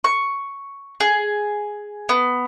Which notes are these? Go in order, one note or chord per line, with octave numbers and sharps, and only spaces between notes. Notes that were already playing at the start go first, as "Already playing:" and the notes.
C#6
G#4
B3